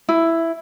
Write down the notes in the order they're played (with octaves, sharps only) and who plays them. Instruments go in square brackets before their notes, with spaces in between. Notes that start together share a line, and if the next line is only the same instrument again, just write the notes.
[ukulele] E4